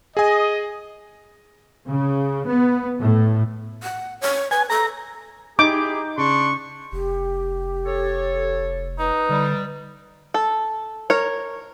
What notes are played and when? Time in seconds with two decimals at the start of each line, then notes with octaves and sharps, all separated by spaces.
0.17 G#4 D#5 G#5
1.86 C#3
2.47 B3
3.00 A2
3.83 F#5
4.21 C#5
4.51 B4 G#5
4.70 A4 A#5
5.59 D#4 E4 G4 G#4 D6 G6
6.18 C#3 D4 C6 C#6
6.92 F1 G4
7.86 A4 C#5
8.99 D#4 B4
9.29 D3 G3
10.34 A4
11.10 A#4 C#5